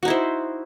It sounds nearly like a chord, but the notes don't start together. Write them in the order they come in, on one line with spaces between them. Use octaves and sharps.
F#4 D#4 E4 C5